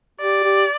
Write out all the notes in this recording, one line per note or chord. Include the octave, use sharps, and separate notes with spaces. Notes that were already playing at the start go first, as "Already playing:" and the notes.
G4 D5
G4